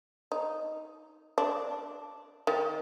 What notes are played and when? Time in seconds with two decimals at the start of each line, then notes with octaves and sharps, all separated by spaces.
0.32 D#4
1.38 D4
2.47 D#3